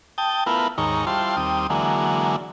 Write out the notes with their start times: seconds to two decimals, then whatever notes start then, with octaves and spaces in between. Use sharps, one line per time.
0.18 G5 A5 D#6
0.46 A3 B3 E4 F4 A#4 B4
0.78 D#2 G#2 D#3 C#5 A#5
1.07 G3 E4 F4 C5 A5 C6
1.37 D#2 G3 C4 D#6
1.70 D3 E3 F#3 G#3 A#3